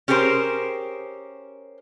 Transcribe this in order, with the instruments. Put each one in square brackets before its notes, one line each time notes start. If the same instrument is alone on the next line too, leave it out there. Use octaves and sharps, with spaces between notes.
[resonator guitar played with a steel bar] C#4 G4 G#4 A#4 C5